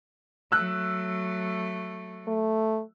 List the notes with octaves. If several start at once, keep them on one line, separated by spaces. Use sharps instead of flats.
F#3 A3 E6 F#6
A3